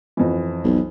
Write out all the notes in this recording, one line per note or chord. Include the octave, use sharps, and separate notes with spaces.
F2 E3
B1